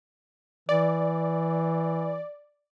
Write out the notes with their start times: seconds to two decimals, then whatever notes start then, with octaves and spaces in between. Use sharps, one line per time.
0.69 E3 D5